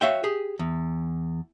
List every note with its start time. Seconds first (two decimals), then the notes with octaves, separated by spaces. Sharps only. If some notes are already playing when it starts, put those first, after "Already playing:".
0.01 F#4 C#5 E5 F5 G5
0.24 G4 G#4
0.59 E2